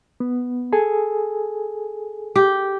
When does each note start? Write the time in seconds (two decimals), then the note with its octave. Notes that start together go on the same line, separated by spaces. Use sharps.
0.20 B3
0.73 G#4 A4 G#5
2.36 G4